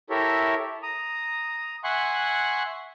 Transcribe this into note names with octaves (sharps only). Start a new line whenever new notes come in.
E4 G4 A4 A#4 C#5 E5
A#5 D#6
E5 F#5 G#5 C6 C#6 F#6